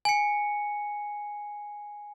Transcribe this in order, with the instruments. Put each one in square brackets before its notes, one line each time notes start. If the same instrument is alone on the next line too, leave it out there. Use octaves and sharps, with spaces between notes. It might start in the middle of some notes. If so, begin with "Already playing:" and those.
[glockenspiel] G#5 C#7